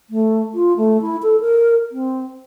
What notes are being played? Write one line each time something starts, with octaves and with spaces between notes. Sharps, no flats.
A3
F4
A3
E4
A4
A#4
C4